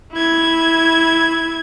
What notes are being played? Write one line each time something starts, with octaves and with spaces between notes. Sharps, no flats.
E4 G#6